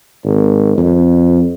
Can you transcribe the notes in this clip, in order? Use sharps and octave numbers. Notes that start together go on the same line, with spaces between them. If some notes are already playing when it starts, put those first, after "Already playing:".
G#1
F2